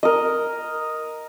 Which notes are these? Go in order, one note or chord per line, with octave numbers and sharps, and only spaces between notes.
A#4 D#5